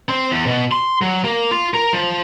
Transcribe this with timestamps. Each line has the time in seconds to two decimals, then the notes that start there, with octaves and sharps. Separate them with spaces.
0.09 C4
0.32 E2
0.46 B2
0.72 C6
1.01 F#3
1.24 A#3
1.51 F4
1.74 A#4
1.93 F3